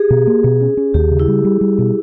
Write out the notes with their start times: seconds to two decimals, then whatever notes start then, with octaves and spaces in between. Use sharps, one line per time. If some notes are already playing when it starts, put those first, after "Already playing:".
Already playing: G4 G#4
0.10 B2
0.27 A#3
0.44 B2
0.61 C#4
0.77 C#4
0.94 D#2 G4
1.11 C#3
1.19 E4
1.28 G3
1.44 G3
1.61 G3
1.78 B2